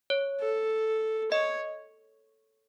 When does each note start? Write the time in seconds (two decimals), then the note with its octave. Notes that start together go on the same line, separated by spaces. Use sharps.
0.10 C#5
0.41 A4
1.31 C#5 D#5